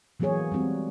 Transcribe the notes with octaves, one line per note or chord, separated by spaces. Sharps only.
E3 F#3 A#3 B3 G#4 C#5
G3 G#3 C4 F#4